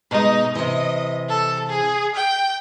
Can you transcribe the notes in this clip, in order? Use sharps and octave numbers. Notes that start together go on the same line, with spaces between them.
B2 G#3 D#4
C3 E3 D#5
A4
G#4
G5